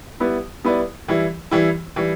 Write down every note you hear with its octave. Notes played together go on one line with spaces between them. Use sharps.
G3 B3 E4 B4 D5
G3 B3 E4 B4 D5
E3 G3 E4
E3 G3 E4
E3 G3